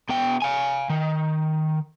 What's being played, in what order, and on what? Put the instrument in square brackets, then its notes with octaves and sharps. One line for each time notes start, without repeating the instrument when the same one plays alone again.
[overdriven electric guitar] B2 G5
F5 G#5
D#3